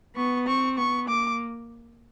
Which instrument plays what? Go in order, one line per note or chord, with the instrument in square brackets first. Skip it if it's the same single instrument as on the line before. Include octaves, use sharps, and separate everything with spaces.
[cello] B3 [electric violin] C#6
[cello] C4 [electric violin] C#6
[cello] B3 [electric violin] C#6
[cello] A#3 [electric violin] D6